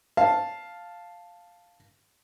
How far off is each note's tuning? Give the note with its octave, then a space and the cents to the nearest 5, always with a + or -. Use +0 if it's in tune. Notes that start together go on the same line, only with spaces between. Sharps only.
F5 +0 A5 +0